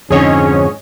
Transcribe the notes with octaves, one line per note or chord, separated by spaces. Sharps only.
F2 G#2 D3 C#4 G#4 C#5 D#5